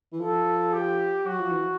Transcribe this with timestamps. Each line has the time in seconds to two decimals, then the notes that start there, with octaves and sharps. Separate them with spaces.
0.12 E3
0.20 F3 A4
0.73 G4
1.25 F#3 F#4
1.39 F3
1.52 E3